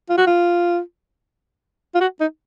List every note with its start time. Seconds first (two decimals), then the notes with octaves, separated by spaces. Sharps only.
0.09 F4
0.17 F#4
0.27 F4
1.95 F4
2.01 F#4
2.20 D#4